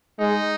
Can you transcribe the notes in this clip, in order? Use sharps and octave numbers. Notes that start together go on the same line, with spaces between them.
G#3 D#4